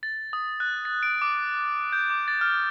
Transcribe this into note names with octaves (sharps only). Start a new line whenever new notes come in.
A6
D#6
F#6
A6
D7
D6
G6
D6
A6
F6